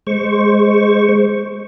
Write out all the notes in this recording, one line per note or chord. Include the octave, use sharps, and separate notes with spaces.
G#3 C5 C#6